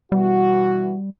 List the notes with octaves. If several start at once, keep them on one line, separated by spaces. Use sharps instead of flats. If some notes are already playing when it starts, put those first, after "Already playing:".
B2 E3 G3 F#4